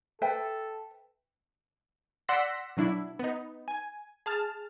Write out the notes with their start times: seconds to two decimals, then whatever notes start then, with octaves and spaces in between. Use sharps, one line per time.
0.22 A4 B4 E5 G5
2.29 D5 F#5 C6 E6 A#6 B6
2.77 B2 F#3 D4 E4
3.19 B3 D#4
3.68 G#5
4.26 G#4 A5 F6